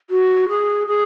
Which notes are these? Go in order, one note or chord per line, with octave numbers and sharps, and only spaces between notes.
F#4
G#4
G#4